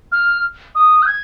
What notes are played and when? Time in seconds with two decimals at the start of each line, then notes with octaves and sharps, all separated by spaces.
0.12 F6
0.75 D#6
1.02 G6
1.07 G#6